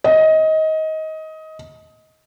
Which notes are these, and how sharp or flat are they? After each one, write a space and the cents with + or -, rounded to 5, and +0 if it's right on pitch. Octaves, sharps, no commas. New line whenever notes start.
D#5 +20